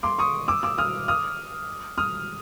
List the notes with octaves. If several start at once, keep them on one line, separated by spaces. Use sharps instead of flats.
C6 D6
C#6 D#6
D6 E6
D6 E6
D#6 F6
D#6 F6
D#6 F6